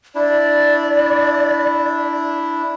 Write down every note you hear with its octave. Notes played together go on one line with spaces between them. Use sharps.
D4 E4 D5